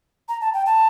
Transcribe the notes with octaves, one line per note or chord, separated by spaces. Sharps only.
A#5
A5
G5
A5